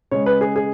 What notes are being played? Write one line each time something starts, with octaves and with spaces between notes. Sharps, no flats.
C#3 G#3 C#5
B4
G#4
G#4